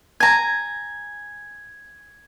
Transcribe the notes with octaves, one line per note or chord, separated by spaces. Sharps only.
G#5 A#5 G#6